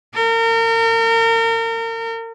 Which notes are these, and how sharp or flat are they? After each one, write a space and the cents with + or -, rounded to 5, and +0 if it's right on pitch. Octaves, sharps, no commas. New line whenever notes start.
A#4 -35